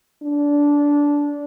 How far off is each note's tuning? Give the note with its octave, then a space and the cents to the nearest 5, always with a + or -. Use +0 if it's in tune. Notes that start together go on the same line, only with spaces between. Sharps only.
D4 -15